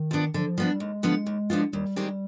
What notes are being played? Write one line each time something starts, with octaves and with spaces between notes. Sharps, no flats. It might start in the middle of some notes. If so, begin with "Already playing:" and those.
Already playing: D#3
F3 B3 D4
D3 F3
F3
F3 G3 B3 D4
G3
D#2 G#3
D3 F3 B3 F4
D#2
D3 F3 B3 F4
D#2 G3
D#3 G#3 C4 G4